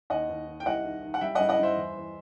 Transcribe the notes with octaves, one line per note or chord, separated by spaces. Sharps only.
D#2 D#5 F#5
D#2
D#3
G5
C2 D#5 F#5
D#3
D#3
F#5
G3 E5 G5
G2 D#5 F#5
D#5 F#5
G2 C5 E5
E2
E2